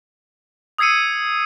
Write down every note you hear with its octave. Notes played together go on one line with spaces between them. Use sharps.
D#6 E6 G#6 C7 C#7 D#7